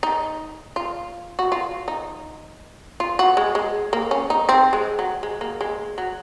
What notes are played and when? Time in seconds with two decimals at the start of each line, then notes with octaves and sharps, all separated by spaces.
0.03 D#4
0.76 F4
1.39 F#4
1.52 F4
1.88 D#4
3.00 F4
3.19 F#4
3.37 G#3
3.55 G#3
3.93 A#3
4.11 C#4
4.30 D#4
4.49 C4
4.73 G#3
4.99 F#3
5.23 G#3
5.41 A#3
5.61 G#3
5.98 F#3